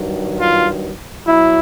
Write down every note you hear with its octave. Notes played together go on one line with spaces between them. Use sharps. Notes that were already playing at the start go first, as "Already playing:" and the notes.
Already playing: G2 D#3 F#3
F4
B2 F#3 E4